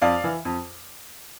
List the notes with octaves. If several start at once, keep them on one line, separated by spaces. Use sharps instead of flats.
F2 D5 F5
E3
F2